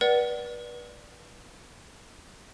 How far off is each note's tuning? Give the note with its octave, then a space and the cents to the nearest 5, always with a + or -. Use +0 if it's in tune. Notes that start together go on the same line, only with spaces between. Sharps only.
B4 -30 D5 +10 F#5 +25